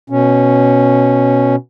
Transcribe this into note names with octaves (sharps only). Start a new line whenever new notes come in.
B2 C#4